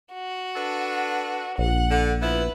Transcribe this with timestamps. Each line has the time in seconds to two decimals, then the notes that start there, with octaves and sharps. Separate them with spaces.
0.13 F#4
0.56 D4 A4 B4
1.58 A#1 F#5
1.91 D3
2.21 F3 B3 E4 B4